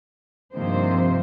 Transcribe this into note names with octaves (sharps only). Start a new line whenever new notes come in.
G2 C3 D#3 F3 A#3 C5